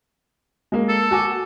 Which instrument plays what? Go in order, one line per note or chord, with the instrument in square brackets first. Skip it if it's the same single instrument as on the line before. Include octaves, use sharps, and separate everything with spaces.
[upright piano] G#3 A#3
[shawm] A4
[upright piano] F#4 G#5 D6